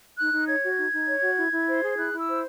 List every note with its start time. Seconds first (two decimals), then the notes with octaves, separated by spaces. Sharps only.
0.18 D#4 F#6
0.33 D#4
0.48 C#5 G#6
0.63 F#4
0.78 D#4
0.93 D#4
1.07 C#5
1.22 F#4
1.37 E4
1.52 E4
1.68 C5
1.82 G#4
1.98 E4 F#6
2.13 E4 E6
2.27 C5